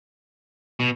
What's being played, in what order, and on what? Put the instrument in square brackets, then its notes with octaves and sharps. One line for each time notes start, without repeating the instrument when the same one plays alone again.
[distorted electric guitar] B2